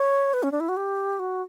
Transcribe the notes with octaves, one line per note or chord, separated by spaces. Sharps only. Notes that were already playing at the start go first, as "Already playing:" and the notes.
Already playing: C#5
B4
C#4
D4
E4
F#4
G4
F#4